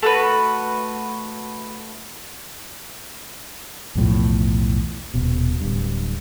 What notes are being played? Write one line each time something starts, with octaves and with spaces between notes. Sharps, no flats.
A3 F#4 B4
B1 E2 A2 F3
D#1 B2
D1 G2